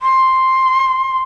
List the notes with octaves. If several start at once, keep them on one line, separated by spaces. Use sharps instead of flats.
C6